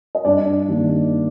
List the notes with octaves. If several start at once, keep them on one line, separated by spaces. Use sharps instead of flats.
D#5
G2 D4 D5
D#3 G3 A#3